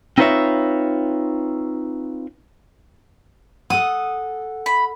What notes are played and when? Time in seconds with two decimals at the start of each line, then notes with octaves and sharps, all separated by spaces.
0.18 C4 D#4 F4 B4 C#5 E5
3.70 A4 F#5 D#6
4.66 B5